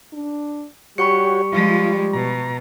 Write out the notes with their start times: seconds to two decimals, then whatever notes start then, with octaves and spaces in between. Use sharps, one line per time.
0.13 D4
0.98 G3 F#4 G4 C#5 B5 C#6 C#7
1.53 F3 G#3 F4
2.13 B2 A#5